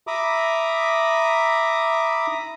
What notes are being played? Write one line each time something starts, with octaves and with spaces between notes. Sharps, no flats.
E5 A#5 B5 D6 D#6